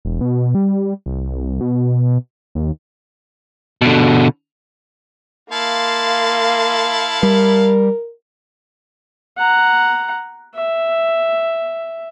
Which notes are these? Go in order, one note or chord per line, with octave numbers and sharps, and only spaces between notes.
E1
B2
G3
C2
B2
D#2
B2 D3
A#3 E4 F5 A5 C6
G3 A#4
F#5 A#5
E5